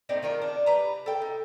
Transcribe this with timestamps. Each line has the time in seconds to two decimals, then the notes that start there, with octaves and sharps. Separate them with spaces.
0.09 A2 C4 D#4 D5
0.23 D#3 F4 A#4
0.42 D4
0.66 G3 B4 A#5
1.06 A4 G5
1.22 D#4